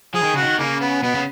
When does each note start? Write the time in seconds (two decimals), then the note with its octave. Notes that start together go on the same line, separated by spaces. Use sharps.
0.14 F3 G#4
0.23 D#3
0.33 C#3 F#4
0.41 D#3
0.58 C#3 A#3
0.81 B3
1.03 B2 B3
1.15 C#3